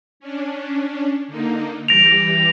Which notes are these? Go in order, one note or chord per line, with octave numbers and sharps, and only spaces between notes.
C#4 D4
D3 A#3 D#4
E3 G3 G4 A#6 D7 F7